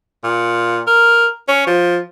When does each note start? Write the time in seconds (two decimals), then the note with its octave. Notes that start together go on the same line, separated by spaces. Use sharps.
0.24 A#2
0.87 A#4
1.48 C#4
1.67 F3